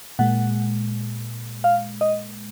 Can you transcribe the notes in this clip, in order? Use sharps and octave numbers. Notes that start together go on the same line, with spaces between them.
A#2 G#3 F#5
F5
D#5